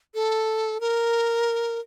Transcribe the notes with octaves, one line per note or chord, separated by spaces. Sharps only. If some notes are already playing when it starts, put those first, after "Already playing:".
A4
A#4